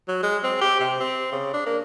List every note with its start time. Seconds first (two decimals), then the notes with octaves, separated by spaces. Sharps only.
0.08 F#3
0.23 G#3
0.44 C4
0.61 G4
0.80 C3
1.00 C4
1.32 C#3
1.53 D4
1.66 A#3